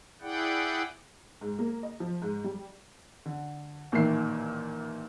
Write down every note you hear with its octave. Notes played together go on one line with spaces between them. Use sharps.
E4 G#4 D5 F#5 G5
G#2
A#3
D#5
F3
G#2
G3
D3
A1 A#2 D#3 E5 C7